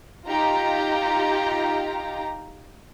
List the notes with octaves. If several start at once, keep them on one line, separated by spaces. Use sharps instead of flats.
D#4 F4 G4 A#5